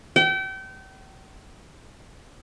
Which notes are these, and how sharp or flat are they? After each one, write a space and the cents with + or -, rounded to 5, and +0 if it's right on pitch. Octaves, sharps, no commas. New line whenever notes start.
G5 -35